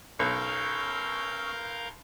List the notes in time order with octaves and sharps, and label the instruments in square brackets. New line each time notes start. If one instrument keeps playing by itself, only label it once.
[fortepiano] B1 [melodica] C#4 C#6 E6 [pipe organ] A#4 F5 G6